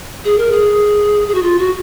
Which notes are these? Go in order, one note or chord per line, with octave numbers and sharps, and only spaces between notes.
G#4
A#4
G#4
G#4
F#4
F4
F#4